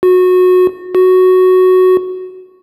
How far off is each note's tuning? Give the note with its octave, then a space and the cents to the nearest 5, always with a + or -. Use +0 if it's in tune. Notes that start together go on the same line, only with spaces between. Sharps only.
F#4 -20
F#4 +0